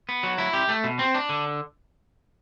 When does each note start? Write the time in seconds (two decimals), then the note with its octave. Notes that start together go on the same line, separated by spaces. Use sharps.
0.09 B3
0.23 F#3
0.38 E4
0.53 G4
0.69 A3
0.84 B2
0.99 C4
1.14 D4
1.29 D3